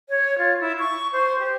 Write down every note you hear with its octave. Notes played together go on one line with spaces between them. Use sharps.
C#5
F4
E4
C#6
C5
G4